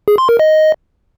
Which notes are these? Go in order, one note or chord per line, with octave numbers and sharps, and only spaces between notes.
G#4
C6
A#4
D#5